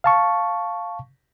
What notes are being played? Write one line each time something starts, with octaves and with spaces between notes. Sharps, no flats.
F5 A5 C#6